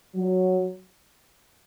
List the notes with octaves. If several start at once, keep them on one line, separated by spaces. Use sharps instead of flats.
F#3